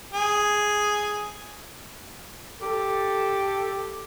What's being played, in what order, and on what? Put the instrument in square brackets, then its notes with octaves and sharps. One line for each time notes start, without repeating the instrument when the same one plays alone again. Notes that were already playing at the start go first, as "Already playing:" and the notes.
[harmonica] G#4
[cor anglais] G4 [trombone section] A4